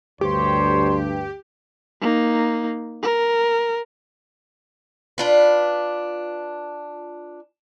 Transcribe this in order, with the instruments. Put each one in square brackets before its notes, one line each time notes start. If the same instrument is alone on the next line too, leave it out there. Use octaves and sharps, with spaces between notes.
[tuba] D2 [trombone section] G2 [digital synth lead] G4 [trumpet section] C5 C#5 C6
[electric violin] A#3 D#4
A#4
[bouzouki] D4 F4 B4